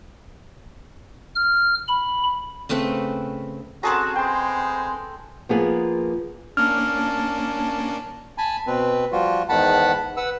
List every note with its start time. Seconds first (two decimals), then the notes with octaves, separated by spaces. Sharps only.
1.36 F6
1.88 B5
2.69 C#3 A3 C4 B4
3.83 C4 C#4 F#4 G#4 A4 A5 A#5
4.16 G#3 B3 C5 G5 C6
5.49 F3 A#3 B3 F4 G#4
6.57 A#3 C#4 D4 A5 F6
8.38 G#5 A5 B5
8.67 B2 C4 B4
9.12 F3 G3 F4 F#4
9.49 E2 G#2 D#3 F#5 A5 B5
10.17 B4 F#5 E6